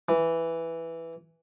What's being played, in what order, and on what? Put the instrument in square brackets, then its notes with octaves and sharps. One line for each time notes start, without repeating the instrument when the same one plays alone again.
[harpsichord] E3